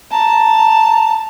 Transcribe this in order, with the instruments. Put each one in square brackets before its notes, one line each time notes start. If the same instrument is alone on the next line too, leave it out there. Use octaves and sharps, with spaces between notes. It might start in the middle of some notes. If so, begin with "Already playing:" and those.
[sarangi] A5 [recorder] A#5